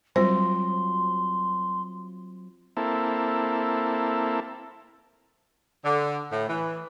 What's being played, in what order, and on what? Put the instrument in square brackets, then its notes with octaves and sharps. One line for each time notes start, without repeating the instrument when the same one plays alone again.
[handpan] F#3 C4 F4 [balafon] G3 C5 [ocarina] C6
[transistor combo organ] A#3 C4 E4 A4
[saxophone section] D3
A2
E3